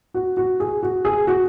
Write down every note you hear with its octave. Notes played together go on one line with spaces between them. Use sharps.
F#4
F#4
G#4
F#4
G#4
F#4